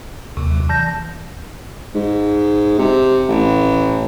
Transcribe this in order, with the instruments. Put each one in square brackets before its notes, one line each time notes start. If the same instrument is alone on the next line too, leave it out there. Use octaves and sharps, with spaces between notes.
[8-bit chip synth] D#2 [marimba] C3
[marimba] F#3
[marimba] E3 [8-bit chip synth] A5 G6 A#6
[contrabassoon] G#2
C3
A1